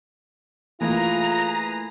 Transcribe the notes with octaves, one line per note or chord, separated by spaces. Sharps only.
E3 A3 A#3 F4 G#4 B4 G#5 A#5